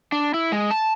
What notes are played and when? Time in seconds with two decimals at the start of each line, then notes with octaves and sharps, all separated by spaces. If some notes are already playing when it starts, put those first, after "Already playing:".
0.12 D4
0.34 E4
0.52 G#3
0.71 A5